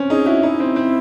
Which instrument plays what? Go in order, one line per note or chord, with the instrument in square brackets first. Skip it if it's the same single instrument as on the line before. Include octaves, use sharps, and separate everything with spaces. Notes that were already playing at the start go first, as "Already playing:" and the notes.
Already playing: [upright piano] C4 C#4
[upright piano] D#4 [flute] G#4
[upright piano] E4 [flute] F#4
[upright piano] D#4 [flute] E4
[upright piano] C4
C4